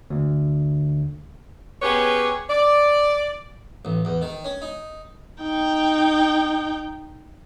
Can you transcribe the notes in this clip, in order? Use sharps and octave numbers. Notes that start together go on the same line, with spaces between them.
D2
B3 C#4 G4 G#4 B4 C#5
D5
A1
E2
D#3
C#4
D#4
D#4 G5